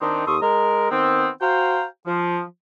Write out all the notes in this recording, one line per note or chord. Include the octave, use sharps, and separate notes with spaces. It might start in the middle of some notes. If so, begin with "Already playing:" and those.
D#3 C4 D4 D#4
D#2 A4 C6 C#6 D#6
G#3 A#4
D#3 B3 C4
F#4 C5 F5 G5 A#5
F3